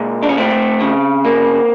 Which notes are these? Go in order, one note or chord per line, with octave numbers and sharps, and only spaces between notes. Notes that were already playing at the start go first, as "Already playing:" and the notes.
Already playing: A#2 G#3
D4
C#4
A3 C4
C#3
A#3